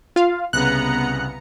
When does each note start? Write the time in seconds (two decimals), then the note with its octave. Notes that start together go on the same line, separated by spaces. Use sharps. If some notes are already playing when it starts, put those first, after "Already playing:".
0.16 F4 F5
0.53 C2 C#3 B3 A#5 F#6 C#7